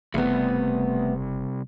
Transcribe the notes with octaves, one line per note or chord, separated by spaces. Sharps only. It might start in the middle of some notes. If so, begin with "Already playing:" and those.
F#1 C2 A3 B3